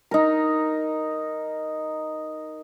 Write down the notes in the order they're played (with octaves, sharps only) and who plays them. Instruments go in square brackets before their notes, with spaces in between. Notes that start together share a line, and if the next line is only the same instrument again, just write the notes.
[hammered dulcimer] D#4 A#4